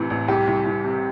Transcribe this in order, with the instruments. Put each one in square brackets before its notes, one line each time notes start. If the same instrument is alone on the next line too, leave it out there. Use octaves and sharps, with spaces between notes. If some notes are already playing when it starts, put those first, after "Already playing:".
Already playing: [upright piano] A1 A2 C3 E3
A1
C2 G4
C2
C2
C3